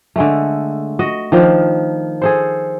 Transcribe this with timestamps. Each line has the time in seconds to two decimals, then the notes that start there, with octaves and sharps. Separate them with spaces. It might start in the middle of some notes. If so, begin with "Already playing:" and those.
0.16 D3 G#3 A3
0.99 F#4 D#5
1.32 D#3 F3 D4
2.22 G#4 A4 C5